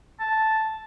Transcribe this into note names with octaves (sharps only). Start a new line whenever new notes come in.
A5